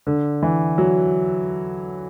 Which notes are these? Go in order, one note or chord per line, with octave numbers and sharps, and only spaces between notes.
D3
E3
F#3